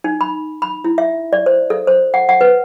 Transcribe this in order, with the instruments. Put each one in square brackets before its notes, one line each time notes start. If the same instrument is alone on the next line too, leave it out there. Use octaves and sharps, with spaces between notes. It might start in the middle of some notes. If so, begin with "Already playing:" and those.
[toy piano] D#4
B5
B5
E4
E5
D5
C5
A4
C5
F#5
F#5
B4